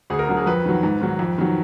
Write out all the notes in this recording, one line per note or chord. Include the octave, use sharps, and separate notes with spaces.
D2 G#4
A#4
D3 F#3
G#4
F2 B4
D#3 F#3
G#2
D#3 F#3
F2
D#3 F#3